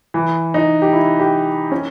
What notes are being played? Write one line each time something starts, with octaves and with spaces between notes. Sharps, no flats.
E3
D#4
G4
E4
G4
C#4